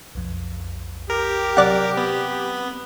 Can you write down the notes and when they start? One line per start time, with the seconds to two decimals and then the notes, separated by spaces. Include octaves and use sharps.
0.15 B1 F2
1.10 G4 A#4
1.57 C3 F#3 C4 D5 F#5
1.97 B3